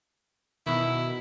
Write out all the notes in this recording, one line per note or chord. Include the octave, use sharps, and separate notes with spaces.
B2 D#3 E4